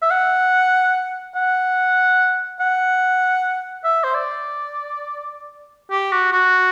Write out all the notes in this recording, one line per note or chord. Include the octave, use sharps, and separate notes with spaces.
E5
F#5
F#5
F#5
E5
C5
D5
G4
F#4
F#4